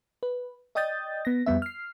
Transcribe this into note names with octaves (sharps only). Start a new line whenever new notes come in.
B4
D5 D#5 G5 D#6 G6 A6
B3 A#6
F2 G3 B3 E5
F6 C7